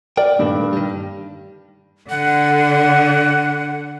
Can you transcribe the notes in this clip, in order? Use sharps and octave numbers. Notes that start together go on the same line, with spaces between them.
A#4 D5 G5
G2 A#2 D#3 A3
D#3 G3
D3 F#5